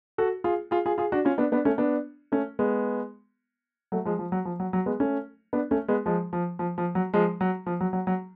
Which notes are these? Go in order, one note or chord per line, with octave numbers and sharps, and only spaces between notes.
F#4 A4
F4 G#4
F4 G#4
F4 G#4
F4 G#4
D4 F#4
C#4 F4
B3 D4
B3 D4
A3 C#4
B3 D4
A3 C#4
G#3 B3
F#3 A3
F3 G#3
F3
F#3
F3
F#3
F#3
G#3 B3
A3 C#4
B3 D4
A3 C#4
G#3 B3
F3 G#3
F3
F3
F3
F#3
F3 G#3
F#3
F3
F#3
F#3
F#3